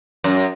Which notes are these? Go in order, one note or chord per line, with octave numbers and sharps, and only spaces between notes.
F#2